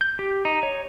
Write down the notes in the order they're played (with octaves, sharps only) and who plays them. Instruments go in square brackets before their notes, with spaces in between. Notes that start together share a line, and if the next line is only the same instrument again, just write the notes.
[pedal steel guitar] G6
G4
D#4
C#5